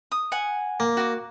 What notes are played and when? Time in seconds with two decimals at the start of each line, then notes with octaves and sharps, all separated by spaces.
0.12 D#6
0.32 F#5 G#5
0.80 A#3
0.97 F#4 D6